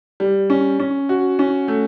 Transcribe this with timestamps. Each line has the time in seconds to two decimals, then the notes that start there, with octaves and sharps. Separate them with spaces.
0.20 G3
0.50 C#4
0.80 C#4
1.09 F#4
1.39 C#4
1.68 A3